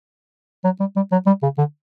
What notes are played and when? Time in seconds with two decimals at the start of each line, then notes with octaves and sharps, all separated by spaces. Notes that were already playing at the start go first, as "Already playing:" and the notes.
0.64 F#3
0.80 G3
0.96 G3
1.12 F#3
1.26 G3
1.43 C#3
1.58 D3